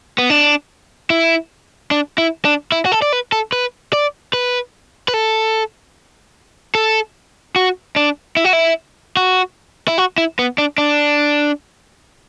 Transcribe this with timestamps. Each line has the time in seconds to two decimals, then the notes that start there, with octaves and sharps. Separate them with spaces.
0.18 B3
0.30 D4
1.10 E4
1.91 D4
2.18 E4
2.45 D4
2.72 E4
2.86 F#4
2.92 A4
3.02 D5
3.13 B4
3.32 A4
3.52 B4
3.93 D5
4.33 B4
5.08 B4
5.14 A4
6.75 A4
7.56 F#4
7.96 D4
8.37 E4
8.45 F#4
8.53 E4
9.17 F#4
9.88 E4
9.98 F#4
10.18 E4
10.39 B3
10.58 D4
10.78 D4